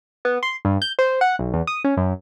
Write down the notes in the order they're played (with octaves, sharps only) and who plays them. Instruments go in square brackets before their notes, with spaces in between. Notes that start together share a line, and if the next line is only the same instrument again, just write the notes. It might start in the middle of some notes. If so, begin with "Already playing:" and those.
[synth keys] B3
C6
G2
G6
C5
F#5
B1
E2
D#6
C#4
F#2